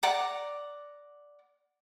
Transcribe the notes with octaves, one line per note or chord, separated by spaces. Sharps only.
D5 F#5 A#5 D6